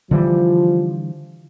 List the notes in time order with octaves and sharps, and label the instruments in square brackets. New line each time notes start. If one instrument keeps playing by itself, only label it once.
[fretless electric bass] D3 E3 G3 [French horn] F3